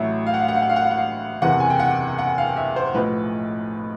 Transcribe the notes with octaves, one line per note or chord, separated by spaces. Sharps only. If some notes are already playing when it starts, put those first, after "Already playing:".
Already playing: A1 A2 F#3 E5
F5
F#5
F5
F#5
F5
F#5
F5
F#5
F5
F#5
F5
F#1 E2 C3 E3 F#5
G#5
G5
F#5
F#5
F5
E5
C5
B1 A2 F3 B4